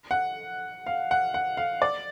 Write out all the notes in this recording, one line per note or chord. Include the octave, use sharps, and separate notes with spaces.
F#5
F5
F#5
F#5
F5
D5